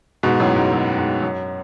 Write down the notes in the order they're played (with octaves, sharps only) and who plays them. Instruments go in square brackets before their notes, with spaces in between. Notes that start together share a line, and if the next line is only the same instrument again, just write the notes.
[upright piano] G#2 B2
F#2 A2
G#2
F#2
G#2
F#2